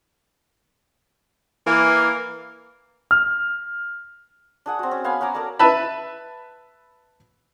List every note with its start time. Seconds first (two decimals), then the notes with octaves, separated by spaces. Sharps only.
1.66 E3 A#3
3.11 F6
4.66 D4 G#4 F#5
4.79 C4 F#4
4.91 C#4
5.04 B3 F5 G#5 B5
5.21 C#4 F#4 A#5 D6
5.35 A4 A#4 D5
5.59 B4 E5 A5 B5